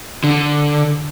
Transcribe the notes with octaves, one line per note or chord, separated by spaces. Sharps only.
D3